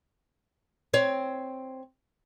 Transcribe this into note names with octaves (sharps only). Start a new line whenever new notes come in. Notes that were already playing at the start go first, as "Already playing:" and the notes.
C4 C#5